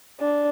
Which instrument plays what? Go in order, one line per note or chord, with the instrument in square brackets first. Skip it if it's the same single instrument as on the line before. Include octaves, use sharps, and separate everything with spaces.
[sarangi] D4